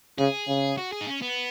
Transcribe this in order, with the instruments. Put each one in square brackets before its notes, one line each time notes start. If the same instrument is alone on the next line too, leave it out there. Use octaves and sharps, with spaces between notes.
[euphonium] C#3 [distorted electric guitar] G#4
[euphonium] C#3
[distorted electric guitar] F#4
G#4
D#4
C#4
B3